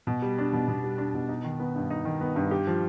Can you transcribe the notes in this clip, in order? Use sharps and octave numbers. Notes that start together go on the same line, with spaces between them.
B2
G3
D4
B2
B2
G3
D4
B2
D#4
D#3
B3
G2
D#4
D#3
B3
G2
G4
F3